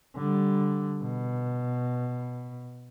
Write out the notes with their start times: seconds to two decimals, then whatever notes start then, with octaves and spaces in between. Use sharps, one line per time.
0.15 D3 G3
1.03 B2